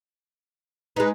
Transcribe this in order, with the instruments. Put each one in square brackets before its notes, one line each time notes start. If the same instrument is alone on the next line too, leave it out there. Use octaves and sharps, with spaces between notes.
[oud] G#3 D#4 [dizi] B4